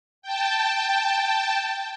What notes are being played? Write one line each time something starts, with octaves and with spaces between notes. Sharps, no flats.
G5 A5